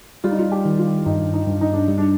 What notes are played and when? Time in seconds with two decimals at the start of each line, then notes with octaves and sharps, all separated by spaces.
0.24 G3 F4
0.31 D#4
0.39 F4
0.52 G4
0.65 D#3
0.79 F4
1.06 G2 D#4
1.34 D#4
1.47 G2
1.61 D#4
1.73 D4
1.88 G3
1.98 D4